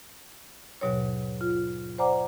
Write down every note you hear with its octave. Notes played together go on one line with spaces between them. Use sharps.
D#2 G#2 B2 F#3 C#5
F4
C5 D5 F#5 G#5 A#5 D6